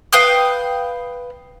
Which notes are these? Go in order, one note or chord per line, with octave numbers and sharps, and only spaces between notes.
B4 F5 G5 D#6